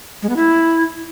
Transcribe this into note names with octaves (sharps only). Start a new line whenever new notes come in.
G#3
B3
E4